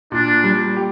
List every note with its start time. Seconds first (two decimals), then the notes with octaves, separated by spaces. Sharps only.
0.12 A#2 D4
0.44 G3
0.76 G4